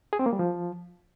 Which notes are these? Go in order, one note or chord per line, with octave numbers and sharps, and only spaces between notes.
G#4
C4
A#3
G3
F3